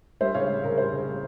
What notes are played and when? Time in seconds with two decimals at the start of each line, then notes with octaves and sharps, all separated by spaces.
0.21 G3 C5 E5
0.34 C#3 C#5 F5
0.49 G3
0.63 C#3 A#4
0.78 G3 C5
0.93 C#3
1.07 G3